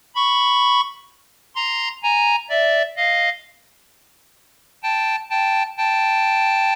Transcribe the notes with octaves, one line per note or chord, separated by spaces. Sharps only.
B5 C#6
A#5 C6
G#5 A#5
D5 E5
D#5 F5
G5 A5
G5 A5
G5 A5